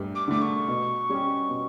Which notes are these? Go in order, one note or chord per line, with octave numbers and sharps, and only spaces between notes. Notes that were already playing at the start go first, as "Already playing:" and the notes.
Already playing: G2 A3
D6
D3 A3 D6
C#6
B2
G3 C#4 G4
B2